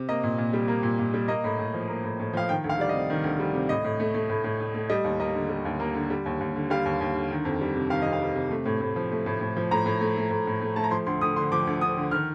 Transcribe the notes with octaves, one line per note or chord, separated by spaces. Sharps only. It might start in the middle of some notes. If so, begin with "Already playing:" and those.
Already playing: C3
A#3 D#5
A#2
A#2
G3
A#3
A#2
A#2
G3
A#3 D#5
A2
A2
F3
A#3
A2
A2
F3 F5
D#3 G5
D2
F5
G3 D5
C3 D#5
D#3
D2
G3
C3
A2 D#5
A2
A3
A3
A2
A2
A3
A3
G3 D#5
D#2
A#3 D#5
D3
G3
D#2
A#3
D3
G3
D#2
D#2
D3
G3 F5
D#2
D#2
D3
D#3
F2
G3
C3
D#3 F5
F2 D#5
F5
G3
C3
A3
A2
A2
F3
A3
A2
A2
F3
A2 A#5
A2
A3
A3
A2
A2
A3
A3 A5
A#5
F3 C6
D2 C6
D2 D#6
D3 C6
F3 D6
D2
D2 D#6
D3
D#3 F6